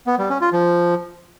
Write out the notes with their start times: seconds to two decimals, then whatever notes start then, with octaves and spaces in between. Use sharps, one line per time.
0.07 B3
0.18 G3
0.30 C#4
0.41 F4
0.53 F3